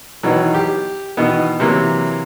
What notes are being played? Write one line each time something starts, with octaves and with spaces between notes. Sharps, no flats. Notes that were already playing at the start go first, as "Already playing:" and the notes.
B2 D#3 E3 F#3
G4
B2 D#3 E3 B3
C3 E3 F#3 A#3